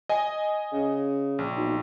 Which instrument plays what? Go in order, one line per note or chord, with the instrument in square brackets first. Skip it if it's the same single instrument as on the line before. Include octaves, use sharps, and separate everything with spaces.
[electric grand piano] D#5 G#5
[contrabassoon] C#3
[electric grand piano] A#1
[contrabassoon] B1